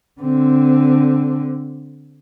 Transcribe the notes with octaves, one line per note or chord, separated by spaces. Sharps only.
D3 C4